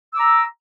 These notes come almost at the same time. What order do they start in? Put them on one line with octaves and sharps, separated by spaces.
E6 D6 A#5